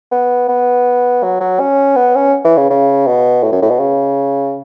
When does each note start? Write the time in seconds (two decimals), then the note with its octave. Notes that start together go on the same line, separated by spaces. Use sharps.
0.12 B3
0.49 B3
1.23 F#3
1.41 F#3
1.60 C#4
1.96 B3
2.15 C#4
2.45 E3
2.57 C#3
2.70 C#3
3.07 B2
3.43 A2
3.52 F#2
3.62 A2
3.71 B2
3.80 C#3